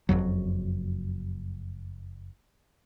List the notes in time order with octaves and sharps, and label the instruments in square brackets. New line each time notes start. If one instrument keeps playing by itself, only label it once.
[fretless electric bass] F#1 C2 F2 F#3